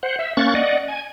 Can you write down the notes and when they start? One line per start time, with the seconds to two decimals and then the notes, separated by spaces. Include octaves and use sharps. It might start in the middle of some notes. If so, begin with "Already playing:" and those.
0.03 C5 F#5
0.19 E5
0.37 A#3 C#4 C#6 F#6 A6
0.55 D5 D#5 F#5
0.88 G#5